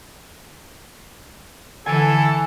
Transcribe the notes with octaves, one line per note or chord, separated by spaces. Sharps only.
D3 E3 A4 G#5